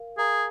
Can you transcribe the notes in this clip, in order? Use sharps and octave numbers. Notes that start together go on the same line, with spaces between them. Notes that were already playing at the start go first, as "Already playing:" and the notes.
Already playing: A#4 F5
G#4 A#4 F5 A#5